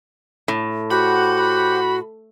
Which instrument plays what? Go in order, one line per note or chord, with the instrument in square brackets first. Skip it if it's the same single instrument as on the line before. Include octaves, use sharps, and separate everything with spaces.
[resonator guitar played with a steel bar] A2
[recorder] F#4 [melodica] G4 C5 F#5 [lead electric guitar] B5